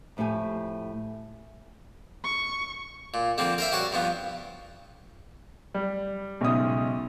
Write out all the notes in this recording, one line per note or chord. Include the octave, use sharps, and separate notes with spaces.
F2 A2 A3 G4 G#5
C#6
A#2
D3 F3 A#3 C4
A#4 C5 E5
G3 F#4 C5 C#5
G2 F3 B3
G3
B1 G#2 C#3 D#5 E5 D#6